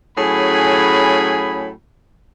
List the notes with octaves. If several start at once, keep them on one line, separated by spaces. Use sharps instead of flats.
A2 F#3 C#4 G#4 G#5 B5